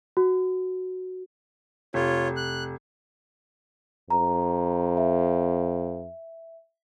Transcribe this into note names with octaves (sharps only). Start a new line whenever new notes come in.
F#4
F1 F4 C#5
F#6
F2 A#5
E5